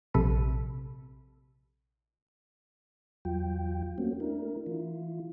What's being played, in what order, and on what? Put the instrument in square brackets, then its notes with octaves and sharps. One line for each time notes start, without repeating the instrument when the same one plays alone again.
[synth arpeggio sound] A#1 C3 A4 B5 D#7
[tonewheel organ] E2 F#3 F4 G5
A3 A#3 C4 C#4 F#4
A3 D4 E4 A#4
E3 E4 F4